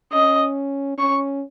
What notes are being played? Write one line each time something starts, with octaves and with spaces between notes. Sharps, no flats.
C#4 D#5
C#4 C#6